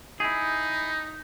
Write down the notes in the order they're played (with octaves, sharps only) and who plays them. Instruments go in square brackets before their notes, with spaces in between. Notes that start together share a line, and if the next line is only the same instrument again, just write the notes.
[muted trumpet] D#4 [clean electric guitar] E4 G#4